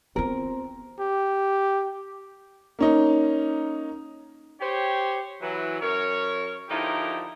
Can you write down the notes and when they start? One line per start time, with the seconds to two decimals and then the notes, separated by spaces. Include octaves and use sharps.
0.16 B3 C4 F4 A#4
0.99 G4
2.79 A#3 C#4 D#4
4.61 G4 C5 C#5
5.41 E3 F#3
5.81 F#2 A#4 C#5
6.69 D3 F3 D#4 E4 G4 A#4